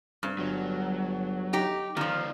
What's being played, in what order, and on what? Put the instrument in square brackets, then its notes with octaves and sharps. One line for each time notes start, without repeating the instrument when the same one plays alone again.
[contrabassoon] C2 [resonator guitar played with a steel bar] G2
[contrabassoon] G1 [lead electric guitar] F#3
[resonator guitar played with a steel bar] D#4 G4
[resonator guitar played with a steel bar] D#3 F3 [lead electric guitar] B3 F4